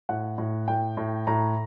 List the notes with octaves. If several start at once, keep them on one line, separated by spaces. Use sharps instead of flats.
A2 F#5
A2
A2 G5
A2
A2 A#5